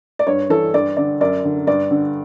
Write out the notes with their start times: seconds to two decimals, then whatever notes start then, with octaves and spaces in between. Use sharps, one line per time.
0.19 D5
0.27 G2 C#5
0.50 E3 A4
0.74 G2 D5
0.97 D3 D5
1.21 F#2 D5
1.45 D3
1.67 G2 D5
1.91 D3